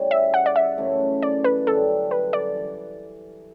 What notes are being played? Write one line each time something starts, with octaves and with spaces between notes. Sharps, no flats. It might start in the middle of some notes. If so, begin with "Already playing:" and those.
Already playing: C#3 G3 A3 C#4 E4
E5
F#5
D5
E5
F#2 C#3 E3 A3
D5
B4
F#2 D3 G3 D4 A4
B4
D5
E3